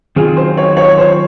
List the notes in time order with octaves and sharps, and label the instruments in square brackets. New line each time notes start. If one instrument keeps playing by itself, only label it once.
[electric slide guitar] D#3 F#3 C4 F4 [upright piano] G#4
[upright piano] C5
C#5
C#5
C5